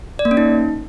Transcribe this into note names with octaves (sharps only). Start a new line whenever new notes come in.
D5
A#3
C#4
D#4